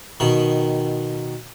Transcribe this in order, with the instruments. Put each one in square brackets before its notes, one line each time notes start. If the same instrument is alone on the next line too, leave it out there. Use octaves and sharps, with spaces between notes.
[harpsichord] B2 D#3